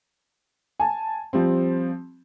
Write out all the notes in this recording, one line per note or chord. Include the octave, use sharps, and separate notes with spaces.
G#5 A5
F3 G3 C4